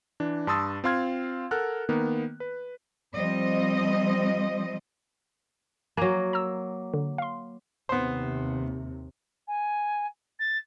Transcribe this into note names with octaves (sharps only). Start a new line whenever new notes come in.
E3 D4
G2 A5 C6 D#6 E6 A6
C4 F4 F5 C6 F6 G#6
A4 A#4 F#5 F6 F#6
D#3 A#3 B3
B4
F3 G3 C4 D#5
F#3 A#3 G#5 A#5
A#5 E6
D3
F5 C6
D#2 C3 B3 C5
G#5
A6